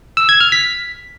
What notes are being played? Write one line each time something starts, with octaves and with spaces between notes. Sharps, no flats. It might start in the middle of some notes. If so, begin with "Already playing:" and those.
E6
G#6
F6
B6